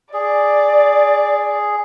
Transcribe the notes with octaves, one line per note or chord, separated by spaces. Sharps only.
G#4 D5